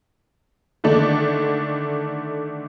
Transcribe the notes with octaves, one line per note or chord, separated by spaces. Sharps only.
D3 D#3 A3 D4